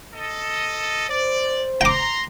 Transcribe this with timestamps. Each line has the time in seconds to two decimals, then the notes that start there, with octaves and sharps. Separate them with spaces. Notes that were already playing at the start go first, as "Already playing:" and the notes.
0.14 A4 D#5
1.10 C5 D5
1.81 G5 A#5 C6 D6